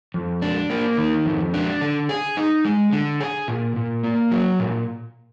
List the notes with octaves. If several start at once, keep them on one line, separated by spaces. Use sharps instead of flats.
F2
D4
A#3
D#3
F2
D4
D3
G#4
D#4
G#3
D3
G#4
A#2
A#2
A#3
F#3
A#2